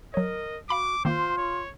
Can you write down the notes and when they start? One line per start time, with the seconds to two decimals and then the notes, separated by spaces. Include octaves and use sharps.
0.14 F#3 A#4 C#5 D#5
0.69 F#4 F5 B5 D6 B6
1.05 D#3 A#3 F4 C5
1.38 C#5